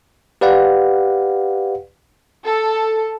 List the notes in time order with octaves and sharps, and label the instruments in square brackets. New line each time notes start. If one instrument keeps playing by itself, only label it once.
[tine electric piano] G4 B4 D5 F5 F#5
[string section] A4